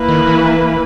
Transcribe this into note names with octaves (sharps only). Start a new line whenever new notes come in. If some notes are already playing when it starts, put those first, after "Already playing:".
Already playing: A#3 E4 B4
D#3
E3